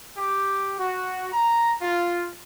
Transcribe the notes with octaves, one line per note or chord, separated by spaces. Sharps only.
G4
F#4
A#5
F4